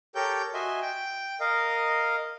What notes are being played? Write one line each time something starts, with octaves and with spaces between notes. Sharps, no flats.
G4 A4 A#4 C#5 G5 G6
F#4 D#5 E5 G#5 C6
G5
A#4 D#5 F5